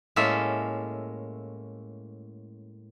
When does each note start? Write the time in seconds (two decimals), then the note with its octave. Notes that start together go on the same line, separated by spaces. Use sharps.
0.16 A2 G#3 A#3 C#4 A4 E5